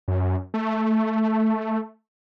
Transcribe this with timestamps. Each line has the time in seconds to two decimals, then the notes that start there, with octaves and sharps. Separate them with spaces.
0.08 F#2
0.54 A3